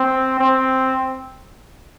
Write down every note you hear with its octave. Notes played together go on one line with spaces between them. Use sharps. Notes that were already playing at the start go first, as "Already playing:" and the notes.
Already playing: C4
C4